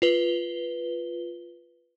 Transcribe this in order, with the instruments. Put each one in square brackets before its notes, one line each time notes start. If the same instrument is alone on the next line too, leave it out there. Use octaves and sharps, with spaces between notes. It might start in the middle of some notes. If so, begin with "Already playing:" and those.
[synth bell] F4 B4 G7